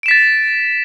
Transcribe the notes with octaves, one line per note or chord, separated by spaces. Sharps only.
A6 B6 D7 E7